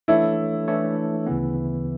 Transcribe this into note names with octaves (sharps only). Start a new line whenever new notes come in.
E3 A3 D4 E4 A4 C#5
E3 A3 D4 A4 C#5
D2 C#3 E3 B3